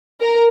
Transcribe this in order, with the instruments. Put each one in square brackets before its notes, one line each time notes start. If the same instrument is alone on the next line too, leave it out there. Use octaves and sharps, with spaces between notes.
[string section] A#4